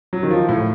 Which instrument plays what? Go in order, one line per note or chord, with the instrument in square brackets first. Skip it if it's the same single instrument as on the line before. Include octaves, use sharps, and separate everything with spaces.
[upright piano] F#3
D#3
F3
A2